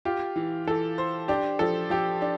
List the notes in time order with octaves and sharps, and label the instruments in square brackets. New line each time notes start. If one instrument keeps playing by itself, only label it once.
[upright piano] F4 [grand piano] G4
[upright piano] E3
[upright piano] E3 [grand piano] A4
[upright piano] C5
[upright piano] D4 [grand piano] G4
[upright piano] F3 [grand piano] A4
[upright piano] F3 [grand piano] G4
[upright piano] D4